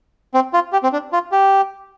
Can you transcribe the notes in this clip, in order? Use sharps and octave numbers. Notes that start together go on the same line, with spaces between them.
C4
F4
G4
C4
D4
F4
G4